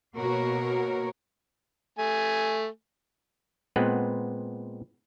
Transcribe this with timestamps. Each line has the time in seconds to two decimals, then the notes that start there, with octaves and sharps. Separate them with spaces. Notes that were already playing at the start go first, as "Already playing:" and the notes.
0.16 B2 A#3 F#4 A#4 C#5
1.99 A3 G#5
3.76 A#2 G#3 B3 C4 B4 F#5